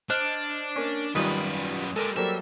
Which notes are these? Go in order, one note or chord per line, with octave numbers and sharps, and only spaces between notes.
D4 C5 D#5 F6 F#6
A#3 C#4
G#1 F#2 D#3 G3 F4 B4 D#6
G#3 G4 A4 A#4
F#3 G3 A#3 A4 C5 E5